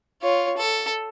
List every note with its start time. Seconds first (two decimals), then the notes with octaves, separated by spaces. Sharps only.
0.22 F4 C#5
0.57 A4